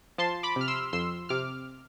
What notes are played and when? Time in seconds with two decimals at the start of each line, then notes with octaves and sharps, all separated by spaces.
0.18 F3 A5 C6
0.43 B5 D6
0.56 C3 F6
0.68 C6 E6
0.93 F2 C6 E6
1.29 C3 D6 F6